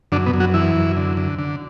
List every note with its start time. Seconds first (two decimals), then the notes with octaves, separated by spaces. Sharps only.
0.12 F#2 D3 D4
0.26 B2 B3
0.33 F#2
0.40 F#3 F#4
0.54 E3 E4
0.76 F#2
0.96 D3
1.17 D3
1.39 D3